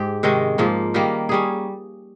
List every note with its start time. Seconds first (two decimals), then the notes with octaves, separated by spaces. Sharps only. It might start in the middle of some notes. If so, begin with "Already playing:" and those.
Already playing: G#2 G4
0.23 C3 D#3 G#3 C#4
0.58 G#2 F3 A#3
0.94 D#3 G3 A#3
1.29 G3 C#4 G#4